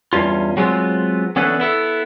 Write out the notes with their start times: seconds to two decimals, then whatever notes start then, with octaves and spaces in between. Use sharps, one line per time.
0.13 E2 G2 C#4 F4
0.57 F#3 G#3 B3 C4 F4
1.36 E3 B3 C#4 D4 A4 B4
1.60 B3 E4 A4